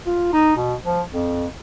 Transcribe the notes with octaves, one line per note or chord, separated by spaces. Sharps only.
F4
D#4
B2
F3
F2